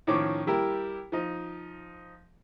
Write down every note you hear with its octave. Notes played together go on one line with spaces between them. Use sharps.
A2 D#3 F3 C#4 D6
G3 E4 G4 A#4
F3 D#4